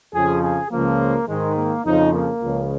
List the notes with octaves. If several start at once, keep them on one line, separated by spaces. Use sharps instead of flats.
F2 C#3 F3 G#4
G#4
C#2 C#3 F3 A#3
G#2 D#3 G#3
A#3
F2 C#3 F3 D#4
A#3
C#2 C#3 F3